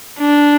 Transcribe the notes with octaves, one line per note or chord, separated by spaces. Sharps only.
D4